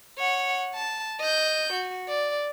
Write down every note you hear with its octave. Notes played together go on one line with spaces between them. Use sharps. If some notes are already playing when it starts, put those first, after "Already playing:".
C#5 F#5
A5
D#5 G6
F#4
D5